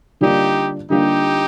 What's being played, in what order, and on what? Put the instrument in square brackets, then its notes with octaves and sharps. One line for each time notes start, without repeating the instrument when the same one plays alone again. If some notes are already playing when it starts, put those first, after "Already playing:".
[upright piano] D3 G3 A#3 D4 F4 [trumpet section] D#4 G4
[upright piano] D3 G3 A#3 D4 F4 [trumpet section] D#4 G4